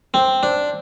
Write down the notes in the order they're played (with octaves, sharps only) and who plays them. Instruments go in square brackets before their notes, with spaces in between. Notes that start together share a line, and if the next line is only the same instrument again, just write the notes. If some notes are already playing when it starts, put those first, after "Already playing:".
[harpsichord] C4 [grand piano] C5
[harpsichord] D4 [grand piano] C5